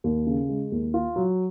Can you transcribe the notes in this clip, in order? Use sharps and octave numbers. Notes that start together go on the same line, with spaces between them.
D#2
C#3
G#3
D#2
F4
F#3